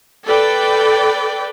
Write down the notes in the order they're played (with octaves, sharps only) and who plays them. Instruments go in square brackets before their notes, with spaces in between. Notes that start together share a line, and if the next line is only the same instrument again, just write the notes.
[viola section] A4 B4 D5 G5